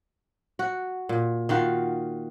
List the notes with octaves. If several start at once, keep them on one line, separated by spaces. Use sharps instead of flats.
F#4
A#2
D#3 F4 F#4